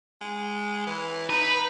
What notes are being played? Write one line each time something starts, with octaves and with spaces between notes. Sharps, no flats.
G#3
E3
D#4 B4